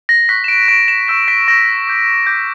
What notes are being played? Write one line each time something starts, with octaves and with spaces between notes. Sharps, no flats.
A#6
C#6 F#6 B6
E7
D7
C#6 F#6 D7
E7
C#6 E6 G6 B6
B6
C#6 G6 A#6
D6 G6
D6 F#6 G6